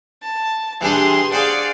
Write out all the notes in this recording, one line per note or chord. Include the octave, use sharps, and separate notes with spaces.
A5
E3 G3 D4 G#4 C6
G#4 C5 D5 F5 F#5